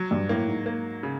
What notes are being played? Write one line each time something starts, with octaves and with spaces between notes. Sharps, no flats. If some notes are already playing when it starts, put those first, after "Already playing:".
Already playing: F#3
G2
A2 A#3
G#2
A#3
C#3